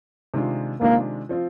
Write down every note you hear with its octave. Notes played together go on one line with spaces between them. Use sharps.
C3 D#3 G#3 D4 F4
C3 D#3 G#3 A#3 D4 F4
F3 C4 F4